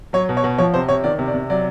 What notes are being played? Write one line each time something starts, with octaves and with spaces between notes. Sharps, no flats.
F#3 C#5
B2
C#5
B2
F3 C#5
C3 C5
C3 C#5
D#3 D5
C3
D5
C3
F#3 D5